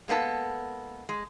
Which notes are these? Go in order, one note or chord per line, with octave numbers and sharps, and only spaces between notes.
G#3 A#3 B3 D4 A4
G#3